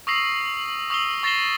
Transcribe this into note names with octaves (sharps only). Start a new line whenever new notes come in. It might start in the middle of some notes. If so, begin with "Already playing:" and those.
C#6 D#6 E6 A#6 C7 F#7
C#6 D#6 E6 C7 G7
C#6 A6 A#6 C7 E7 G7